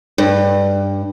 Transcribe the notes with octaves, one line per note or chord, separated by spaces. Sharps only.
G2